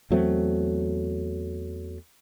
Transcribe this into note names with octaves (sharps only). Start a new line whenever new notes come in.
E2 F#3 A3 C4